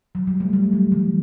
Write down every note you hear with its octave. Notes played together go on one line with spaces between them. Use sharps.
F#3
G3
A3
G3
F#3
E3